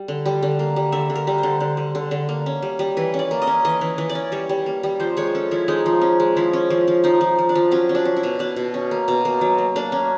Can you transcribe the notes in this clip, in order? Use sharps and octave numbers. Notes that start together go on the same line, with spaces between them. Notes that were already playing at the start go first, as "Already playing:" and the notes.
Already playing: G3
D3
G3
D3
A#3
G3
D3 E5
D3
A#4
G3
C5
D3
D3
G3
D3
D3
A#3
C#4
G3
G3
E3 B4
C#4
D5
A#3
D#5
C#4
E3 D#5
E3
E3
D5
C#4
G3 C#5
G3
A#3
G3
F3 C5
G#3 C#5
C#4 A4
F3 E4
G#3 D#4
F3
C#4
G#3
F3 E4
C#4
F3
F3
F3 D#4
F3
F3
D4
F3
F#3 C#4
C#4
D4
C#4
E4
B2
B2 D4
B2
C#4
A#3
B2
A#3
F#3
A#3
A#3 D4
C#4